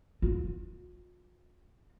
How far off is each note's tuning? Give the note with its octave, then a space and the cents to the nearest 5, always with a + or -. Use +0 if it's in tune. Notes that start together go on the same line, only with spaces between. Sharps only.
F4 +45